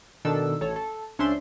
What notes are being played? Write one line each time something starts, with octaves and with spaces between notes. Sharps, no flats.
B2 D#3 D4 A4 E6
A1 A4 C#5
A4
C#2 C#4 D4 C5 E5 C6